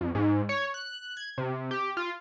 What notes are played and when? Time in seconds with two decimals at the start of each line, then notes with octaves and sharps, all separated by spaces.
0.01 F2
0.15 G#2
0.49 C#5
0.74 F#6
1.17 G#6
1.38 C3
1.71 G4
1.97 F4